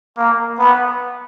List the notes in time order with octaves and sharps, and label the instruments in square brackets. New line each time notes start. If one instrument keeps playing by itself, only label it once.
[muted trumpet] A#3
B3